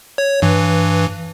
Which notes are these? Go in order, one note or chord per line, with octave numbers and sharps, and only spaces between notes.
C#5
G2 E3